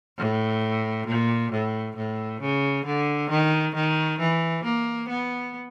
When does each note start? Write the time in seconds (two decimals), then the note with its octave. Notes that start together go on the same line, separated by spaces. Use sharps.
0.18 A2
1.07 A#2
1.52 A2
1.96 A2
2.41 C#3
2.85 D3
3.30 D#3
3.75 D#3
4.19 E3
4.64 A#3
5.09 B3